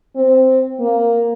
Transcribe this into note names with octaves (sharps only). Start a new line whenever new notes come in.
C4
A#3